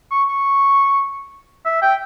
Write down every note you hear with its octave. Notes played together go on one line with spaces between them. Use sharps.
C#6
C#6
E5
G5